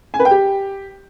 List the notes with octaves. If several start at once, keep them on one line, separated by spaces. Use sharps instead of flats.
G#5
B4
G5
G4